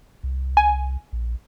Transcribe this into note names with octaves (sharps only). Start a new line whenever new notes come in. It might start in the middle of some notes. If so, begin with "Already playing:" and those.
C2
G#5
A#1